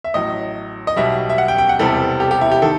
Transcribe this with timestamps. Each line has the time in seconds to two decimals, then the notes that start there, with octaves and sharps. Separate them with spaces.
0.04 E5
0.14 A1 A2 F#3 D#5
0.87 D#5
0.97 B1 B2 G3 E5
1.29 E5
1.38 F#5
1.48 G5
1.58 G5
1.69 F#5
1.79 E1 E2 C3 E3 G3 A4
2.20 G4
2.31 G4
2.41 E4
2.52 G4
2.62 D#3 A4